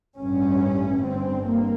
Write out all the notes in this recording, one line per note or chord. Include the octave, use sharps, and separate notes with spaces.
A1 G2 C#4
G1 G2 C4
A#3